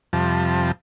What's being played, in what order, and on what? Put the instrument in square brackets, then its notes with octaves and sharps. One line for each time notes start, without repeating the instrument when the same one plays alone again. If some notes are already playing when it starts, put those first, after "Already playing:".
[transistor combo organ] F2 C3 F3 G3 A5